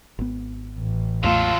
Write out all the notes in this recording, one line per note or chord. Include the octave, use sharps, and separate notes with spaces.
G#1 B3
A1
E2 F#3 A3 F4 A4